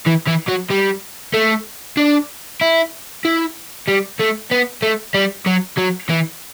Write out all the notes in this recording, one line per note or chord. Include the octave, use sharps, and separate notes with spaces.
E3
E3
F#3
G3
A3
D4
E4
E4
G3
A3
B3
A3
G3
F#3
F#3
E3